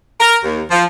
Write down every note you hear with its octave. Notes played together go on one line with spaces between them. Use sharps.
A#4
D#2
F3